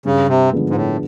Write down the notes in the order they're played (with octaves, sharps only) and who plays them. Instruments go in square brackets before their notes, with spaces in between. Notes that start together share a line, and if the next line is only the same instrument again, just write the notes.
[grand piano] G2 [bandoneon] C#3
[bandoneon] C3
[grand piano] D3 F3 G#3 B3
[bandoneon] G#2
A2